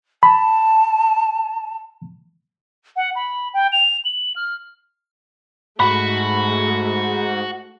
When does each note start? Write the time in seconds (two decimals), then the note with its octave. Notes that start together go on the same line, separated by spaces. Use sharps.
0.23 A5 B5
2.96 F#5
3.15 B5
3.54 G5
3.72 F7
4.05 F#7
4.36 F6
5.80 G#2 G#3 A3 F#4 F#5 B5